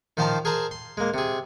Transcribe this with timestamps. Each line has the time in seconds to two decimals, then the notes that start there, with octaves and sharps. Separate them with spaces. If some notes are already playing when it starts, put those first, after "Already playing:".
0.17 D#3 F3 C5 F5 A5 A#5
0.45 G#4 A#4 C5 A5 A#5
0.71 C6
0.97 G#3 A#3
1.14 C3 G#4